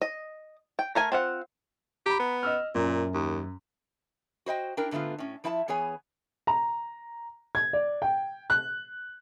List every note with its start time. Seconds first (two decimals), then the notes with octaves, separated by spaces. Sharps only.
0.02 D#5
0.79 G5
0.95 A3 A#4 G#5
1.12 C4 F4 F#5
2.06 G4 A#5 B5
2.19 B3
2.43 D#5 E6 F6
2.75 F#2 A#2
3.14 D#2
4.46 F#4 C5 D#5 G5
4.77 D4 E4 A#4 G5
4.91 G#2 D3 A3 B3 F4
5.18 A2 C#4
5.44 F3 E4 E5 G#5 A5
5.68 E3 B3 G#4 C#5 G#5
6.47 A#5
7.55 G#6
7.73 D5
8.02 G5
8.50 F#6